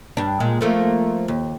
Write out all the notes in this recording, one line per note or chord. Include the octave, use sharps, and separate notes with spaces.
G2 D4
A#2 G#3
F3 A3 A#3
D#2